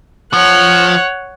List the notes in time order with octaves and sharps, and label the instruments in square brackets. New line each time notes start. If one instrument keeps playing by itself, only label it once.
[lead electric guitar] F3 [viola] C#5 F#5